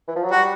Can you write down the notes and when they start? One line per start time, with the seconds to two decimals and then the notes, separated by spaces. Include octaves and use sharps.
0.08 E3
0.16 F3
0.24 F#3
0.31 G3 F#4